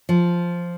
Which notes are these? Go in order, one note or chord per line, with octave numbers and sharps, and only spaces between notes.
F3